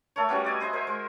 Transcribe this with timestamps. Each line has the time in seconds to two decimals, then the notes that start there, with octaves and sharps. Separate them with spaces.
0.16 A3 A4 A#4 C#5
0.29 G3 B3 C#4 F#4
0.44 D5 D#5 G#5
0.60 G#4 C5 D#5 E5
0.73 A#4 C5 E5
0.87 G#3